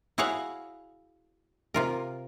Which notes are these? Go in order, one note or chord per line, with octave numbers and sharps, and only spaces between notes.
E4 F#4 G#4 C#5 F5 F#5
C3 F4 A#4